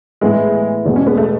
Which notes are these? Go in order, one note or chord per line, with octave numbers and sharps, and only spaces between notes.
A2 E3 G#3 B3 E4
E2 B2 G#3
C#4
B3
A3